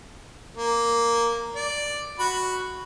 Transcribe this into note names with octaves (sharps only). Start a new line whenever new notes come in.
A#3
D5
F#4 B5